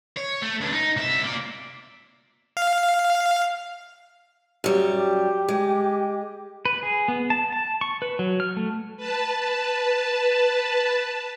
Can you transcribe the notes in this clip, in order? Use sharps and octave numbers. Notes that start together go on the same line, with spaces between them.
C#5
A3
C#2 D4
D#4
C2 E5
A#3 D5
F5
F#2 G3
G4
G#3
B4
G#4
B3
A5
A5
C#6
B4
F#3
F6
A3
B4 A5